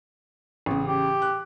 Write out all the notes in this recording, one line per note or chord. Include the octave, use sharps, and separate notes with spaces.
A1 C#3
G4
F#6